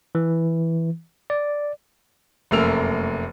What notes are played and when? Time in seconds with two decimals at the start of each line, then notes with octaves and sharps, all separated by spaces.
0.15 E3
1.30 D5
2.51 F1 F#2 A3 A#3 E6 F7